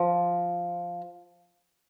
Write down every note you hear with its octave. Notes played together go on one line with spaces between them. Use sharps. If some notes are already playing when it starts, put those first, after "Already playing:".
Already playing: F3